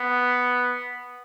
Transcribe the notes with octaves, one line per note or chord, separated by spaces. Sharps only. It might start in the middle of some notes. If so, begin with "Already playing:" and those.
Already playing: B3